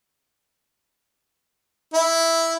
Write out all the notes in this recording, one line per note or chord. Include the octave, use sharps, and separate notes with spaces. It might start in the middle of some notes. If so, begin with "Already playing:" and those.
E4